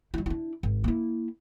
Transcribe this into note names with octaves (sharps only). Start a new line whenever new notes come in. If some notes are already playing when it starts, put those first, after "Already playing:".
G3 E4
D4 E4
G#1
A#3 E4